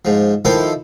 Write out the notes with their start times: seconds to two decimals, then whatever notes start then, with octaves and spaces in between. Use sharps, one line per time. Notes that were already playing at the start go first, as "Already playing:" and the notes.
0.05 G#2 F3
0.45 D#3 F3 E4 A4 C5